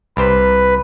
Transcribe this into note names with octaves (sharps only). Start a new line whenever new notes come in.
C2 G4 B4 C5